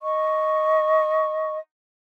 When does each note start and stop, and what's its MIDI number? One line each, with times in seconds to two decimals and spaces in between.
0.01 1.57 75
0.01 1.57 85